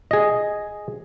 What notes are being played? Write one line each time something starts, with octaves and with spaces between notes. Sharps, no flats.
G#4 D#5